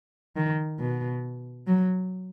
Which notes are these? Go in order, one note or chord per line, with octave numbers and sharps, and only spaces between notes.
D#3
B2
F#3